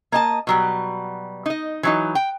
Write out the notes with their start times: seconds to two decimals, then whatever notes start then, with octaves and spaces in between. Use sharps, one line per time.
0.12 A#3 D#5 A5
0.47 B2 F#3 G3
1.46 D#4 D#5
1.83 E3 F#3 D#4
2.15 G5